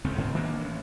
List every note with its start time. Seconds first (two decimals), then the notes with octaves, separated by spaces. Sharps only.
0.05 C#2 C#3 A3 C4
0.18 G#2 B2 C4
0.35 D#3 A#3 D4
0.57 A1